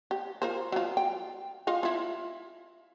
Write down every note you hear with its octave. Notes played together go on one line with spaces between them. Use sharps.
G4
F4 A#4 C5
F#3 F4
G5
F4 D#5 F5
E4 F4